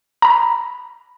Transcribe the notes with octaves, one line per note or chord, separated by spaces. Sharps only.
A#5 B5